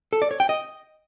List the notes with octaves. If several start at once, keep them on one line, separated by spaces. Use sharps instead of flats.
A4
D5
C#5
G5
D#5